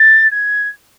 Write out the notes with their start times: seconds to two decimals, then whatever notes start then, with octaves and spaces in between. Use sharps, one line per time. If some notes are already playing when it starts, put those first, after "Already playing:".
Already playing: A6
0.31 G#6